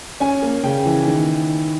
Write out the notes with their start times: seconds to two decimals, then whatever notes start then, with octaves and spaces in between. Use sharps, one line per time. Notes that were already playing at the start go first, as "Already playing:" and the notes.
0.20 C#4 G#5
0.42 A#3
0.63 C#3 G5
0.85 E3
1.07 D#3